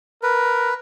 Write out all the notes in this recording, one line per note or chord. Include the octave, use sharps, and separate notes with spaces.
A#4 B4